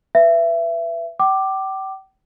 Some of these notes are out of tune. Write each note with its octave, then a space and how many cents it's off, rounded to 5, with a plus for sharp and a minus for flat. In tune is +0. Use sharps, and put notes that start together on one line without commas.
B4 +10 E5 +25
G5 -40 D6 +10